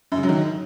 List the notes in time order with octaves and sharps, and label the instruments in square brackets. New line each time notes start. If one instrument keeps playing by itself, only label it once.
[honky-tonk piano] F#2
C#3
F#3
D#3